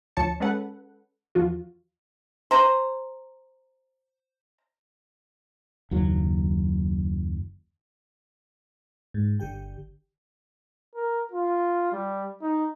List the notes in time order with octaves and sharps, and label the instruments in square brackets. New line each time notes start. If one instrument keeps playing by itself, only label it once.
[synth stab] D2 F3 C#5 A5 C#7
G#3 C#4 A4 B4 F#5
E2 F3 F4 F#4
[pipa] C5 A#5
[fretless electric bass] F#1 D#2 F#3
[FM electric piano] G#2
G1 D3 G4 G5
[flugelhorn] A#4
F4
G3
D#4